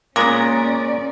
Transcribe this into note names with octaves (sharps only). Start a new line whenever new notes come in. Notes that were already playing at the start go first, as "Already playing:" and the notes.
A#2 G#3 A#3 B3 C#4 A#4 D5 A#5